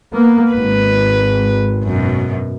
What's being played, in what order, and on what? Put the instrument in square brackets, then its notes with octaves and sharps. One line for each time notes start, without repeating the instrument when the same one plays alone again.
[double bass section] A#3 B3
[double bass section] G#1 [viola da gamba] B4
[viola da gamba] F#2 B2